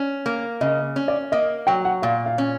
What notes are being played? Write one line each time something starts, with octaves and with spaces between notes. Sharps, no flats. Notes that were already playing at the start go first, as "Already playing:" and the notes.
Already playing: C#4
A#3
C#3 D#5
C#4
D5
A#3 D#5
F#3 G5
F#5
A#2 F5
F5
C#4